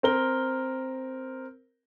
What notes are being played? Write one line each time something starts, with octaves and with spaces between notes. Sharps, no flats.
C4 A#4 G7